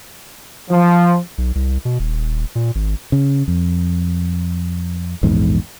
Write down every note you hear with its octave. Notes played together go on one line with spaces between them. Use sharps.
F3
B1
C2
B2
D#1
A#2
G#1
C#3
F2
A#1 E2 G#2